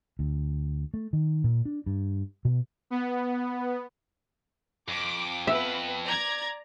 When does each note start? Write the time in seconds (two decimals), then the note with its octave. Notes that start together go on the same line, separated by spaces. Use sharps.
0.19 D2
0.94 A3
1.13 D#3
1.44 A#2
1.65 D4
1.86 G2
2.45 B2
2.90 B3
4.88 F2 D6
5.47 B3 B4 E5
6.06 D5 A#5 G#6